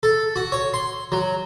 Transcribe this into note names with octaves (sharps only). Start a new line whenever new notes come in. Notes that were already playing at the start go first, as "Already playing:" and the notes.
A4
F#4
C#5
C6
F#3